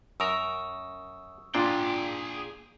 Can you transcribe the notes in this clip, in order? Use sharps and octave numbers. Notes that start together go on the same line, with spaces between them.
F#2 A#4 C#6 D#6 E6
A#2 D4 F4 G#4 G5